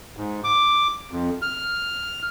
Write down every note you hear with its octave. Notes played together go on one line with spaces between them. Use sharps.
G#2
D6
F2
F6